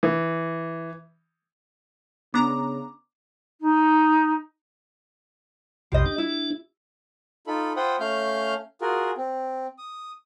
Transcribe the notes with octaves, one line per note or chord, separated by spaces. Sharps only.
E3
C#3 B3 D4 A#5 D6
D#4
B1 F2 C3 G4 D#5
D4
E4
D#4 F4 A4 B5
F4 C5 F#5 G5 B5 D#6
A3 C#4 F5 F6 G6
F4 F#4 G#4 A#4
C4
D#6